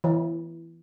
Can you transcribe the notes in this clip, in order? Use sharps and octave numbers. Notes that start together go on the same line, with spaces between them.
E3